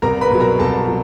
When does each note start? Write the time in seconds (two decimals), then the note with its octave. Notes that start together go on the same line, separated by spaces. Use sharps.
0.02 C2 A#4 A#5
0.21 B4 B5
0.30 B2 F#3
0.40 A#4 A#5
0.59 C2 A4 A5
0.88 F#3